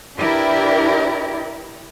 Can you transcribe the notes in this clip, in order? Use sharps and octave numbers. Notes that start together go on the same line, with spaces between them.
D4 E4 G4 A#4 B4 D5